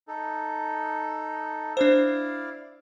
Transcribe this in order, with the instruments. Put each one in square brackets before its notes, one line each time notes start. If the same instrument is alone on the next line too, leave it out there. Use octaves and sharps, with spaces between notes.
[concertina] D#4 A4
[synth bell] D4 C5 [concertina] E4 D5 F5